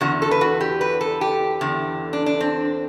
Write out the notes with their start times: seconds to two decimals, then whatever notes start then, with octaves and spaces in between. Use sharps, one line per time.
0.01 E2 D3 F#4
0.22 A4
0.31 B4
0.41 F#4
0.61 G4
0.81 B4
1.01 A4
1.21 G4
1.61 E2 D3
2.13 D4
2.26 D4
2.41 C4